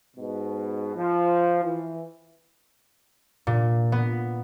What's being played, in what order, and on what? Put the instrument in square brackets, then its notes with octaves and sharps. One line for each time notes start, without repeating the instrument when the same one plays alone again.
[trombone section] G#2 B2
F3
E3
[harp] A#2
B3